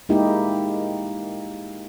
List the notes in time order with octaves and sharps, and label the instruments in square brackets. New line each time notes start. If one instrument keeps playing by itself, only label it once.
[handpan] G#3 A#3 D#4 E4 G4